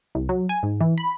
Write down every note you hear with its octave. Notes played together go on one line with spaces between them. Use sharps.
C2
F#3
G#5
G#2
E3
B5